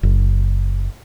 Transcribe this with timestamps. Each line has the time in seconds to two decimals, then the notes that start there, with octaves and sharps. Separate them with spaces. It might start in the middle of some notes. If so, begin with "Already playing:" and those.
0.03 F#1